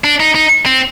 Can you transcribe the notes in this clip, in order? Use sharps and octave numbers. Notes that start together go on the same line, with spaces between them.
D4
D#4
D#4
C4